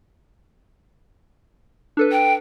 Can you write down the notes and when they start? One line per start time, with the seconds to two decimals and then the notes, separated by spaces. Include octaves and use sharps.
1.97 D4 A4 B4
2.11 G5